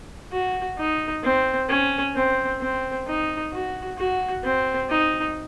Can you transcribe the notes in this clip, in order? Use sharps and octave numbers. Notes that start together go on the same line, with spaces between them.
F#4
D#4
C4
C#4
C4
C4
D#4
F#4
F#4
C4
D#4